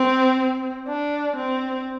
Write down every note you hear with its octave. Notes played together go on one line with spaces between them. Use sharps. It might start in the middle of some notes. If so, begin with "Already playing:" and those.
Already playing: C4
D4
C4